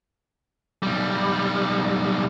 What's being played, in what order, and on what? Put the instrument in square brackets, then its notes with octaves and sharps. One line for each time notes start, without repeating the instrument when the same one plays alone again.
[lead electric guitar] B1 G3